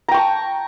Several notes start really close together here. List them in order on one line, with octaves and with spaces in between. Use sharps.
A#5 G5 C#6 A5